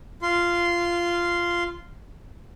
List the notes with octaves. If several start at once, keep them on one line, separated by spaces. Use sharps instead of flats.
F4 C6